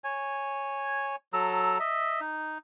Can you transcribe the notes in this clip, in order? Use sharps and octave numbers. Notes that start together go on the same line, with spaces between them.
C#5 G#5
F#3 A4 A#5 E6
D#5 E5
D#4